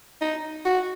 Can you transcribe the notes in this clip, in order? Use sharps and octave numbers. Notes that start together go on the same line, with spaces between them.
D#4
F#4